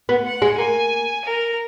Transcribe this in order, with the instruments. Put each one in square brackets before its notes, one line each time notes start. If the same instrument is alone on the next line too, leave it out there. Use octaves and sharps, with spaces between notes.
[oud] B3
[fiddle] F#5
[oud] G#3
[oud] A#3 [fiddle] G#5
[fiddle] A#4